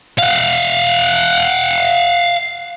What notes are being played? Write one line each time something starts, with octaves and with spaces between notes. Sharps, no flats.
F5 F#5